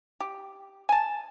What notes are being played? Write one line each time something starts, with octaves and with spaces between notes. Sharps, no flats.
G4
G#5 A5